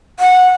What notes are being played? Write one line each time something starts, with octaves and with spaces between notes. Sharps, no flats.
F#5